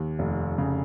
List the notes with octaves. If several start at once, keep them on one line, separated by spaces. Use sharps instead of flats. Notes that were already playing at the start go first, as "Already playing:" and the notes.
Already playing: D#2
F1
C#3